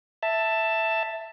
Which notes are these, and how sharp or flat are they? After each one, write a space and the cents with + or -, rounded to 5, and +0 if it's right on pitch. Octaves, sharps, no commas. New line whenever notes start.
E5 +0 A5 +10